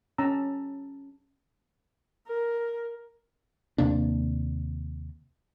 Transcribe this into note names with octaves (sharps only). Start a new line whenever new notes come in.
C#4 A5 A#5 E6
A#4
D#2 C3 A#3 D4